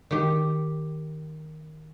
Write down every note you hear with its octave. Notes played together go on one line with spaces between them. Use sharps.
D#3 G4